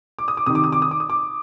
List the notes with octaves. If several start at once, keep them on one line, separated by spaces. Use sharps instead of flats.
D6
D#6
D6
C3 D#3 D#6
D6
D#6
D6
D#6
D6
D#6
D6